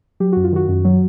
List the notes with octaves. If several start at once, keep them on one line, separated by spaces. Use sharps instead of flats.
F#3 G4
F#2 F#4
F4
D#3 F#4
F#2
F#3